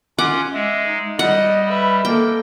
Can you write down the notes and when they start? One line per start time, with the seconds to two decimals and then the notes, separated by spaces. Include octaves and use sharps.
0.19 C#4 F4 F#5 D6
0.54 G#3 E5
0.86 D#4
1.19 G3 D#5 F#5
1.67 B4 E5
2.05 A#3 A4 G5